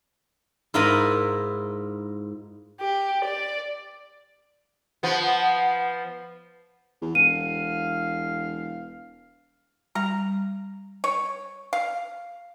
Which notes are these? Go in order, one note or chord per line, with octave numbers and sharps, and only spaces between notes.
G#2 E4 F4 A#4 D#5 B5
G4
D5
F3 B3
E2
E1 F5 D#7
G3 A#5
C#5
F5